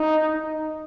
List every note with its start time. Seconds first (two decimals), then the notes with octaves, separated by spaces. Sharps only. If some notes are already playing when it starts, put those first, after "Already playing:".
Already playing: D#4